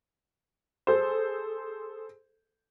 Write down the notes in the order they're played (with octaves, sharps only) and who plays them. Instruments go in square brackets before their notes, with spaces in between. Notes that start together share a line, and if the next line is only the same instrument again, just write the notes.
[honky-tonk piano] G#4 A4 C5